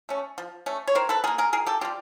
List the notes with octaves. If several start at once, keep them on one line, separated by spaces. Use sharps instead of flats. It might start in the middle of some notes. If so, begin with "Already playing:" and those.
A3 C#4
F3
A3 C#4
C#5
D#3 A#4 C5
A4 B4
G3 A#3 G#4 A#4
G#4 A#4
D#3 G#4 A#4
G4 A4
G3 A#3 F4 G4